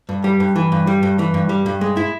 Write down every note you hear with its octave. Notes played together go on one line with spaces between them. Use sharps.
G2
G3
G2
E3
G2
G3
G2
E3
G2
G3
G2
G#3
E4